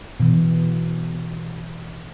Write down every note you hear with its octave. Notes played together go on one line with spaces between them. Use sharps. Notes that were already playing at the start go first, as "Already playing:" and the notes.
B2 E3